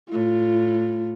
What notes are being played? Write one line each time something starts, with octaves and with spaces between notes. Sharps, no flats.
A2 F4